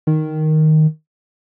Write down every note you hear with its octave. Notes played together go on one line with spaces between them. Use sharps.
D#3